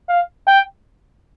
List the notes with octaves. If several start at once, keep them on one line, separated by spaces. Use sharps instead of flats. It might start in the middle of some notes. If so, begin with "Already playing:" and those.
F5
G5